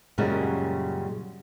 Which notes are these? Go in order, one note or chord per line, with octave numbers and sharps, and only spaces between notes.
F#2 A#2 C#3 G3 G#3 F#4